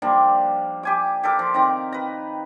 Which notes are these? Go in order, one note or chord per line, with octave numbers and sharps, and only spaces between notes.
F3 G3 A#3 D4
G4 G#5 D6
G4 A4 A#4 D6
F3
D#3 C4 A#5 D6
B4 A#5